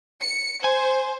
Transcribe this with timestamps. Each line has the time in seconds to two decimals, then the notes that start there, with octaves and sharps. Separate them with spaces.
0.22 C#7
0.64 C5 G#5